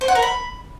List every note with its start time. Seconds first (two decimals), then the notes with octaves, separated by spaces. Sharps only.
0.01 C5
0.08 F#5
0.15 A#4
0.22 B5